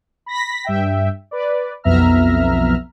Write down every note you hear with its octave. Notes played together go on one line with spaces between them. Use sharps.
B5 A#6 B6
G2 E5 G5
B4 D5
B1 F2 B3 E5 A#5 F6